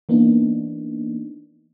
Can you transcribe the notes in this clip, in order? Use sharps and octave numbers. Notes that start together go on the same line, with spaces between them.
E3 A#3 B3 D4 D#4